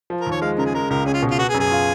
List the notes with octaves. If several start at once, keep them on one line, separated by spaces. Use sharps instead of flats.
F3
A#4
D#2 C#5
G#3 F5
C#3 A#4
G#4
G#3 A#4
C#2 A#4
C#4 G#4
F4
B2
F4
B3 F#4
G#4
F#2
G#4
F4